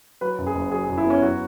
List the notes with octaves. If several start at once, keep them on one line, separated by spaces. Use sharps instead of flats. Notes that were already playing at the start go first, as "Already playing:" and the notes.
F#3 B4
F#2
G#4
F#1
F#3 G#4
G#4
F#2
E4
B3 C#4
F#3 F#4